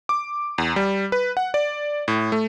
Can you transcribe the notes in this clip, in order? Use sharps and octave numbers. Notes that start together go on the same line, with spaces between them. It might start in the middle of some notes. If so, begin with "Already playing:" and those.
D6
E2
G3
B4
F#5
D5
A2
A3